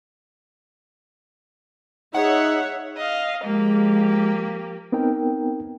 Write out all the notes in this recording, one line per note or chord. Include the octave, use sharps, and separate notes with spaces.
D#4 G#4 C#5 E5 F#5
D#5 F5
F3 G#3 A#3 G4
B3 C4 D#4 A#4 G5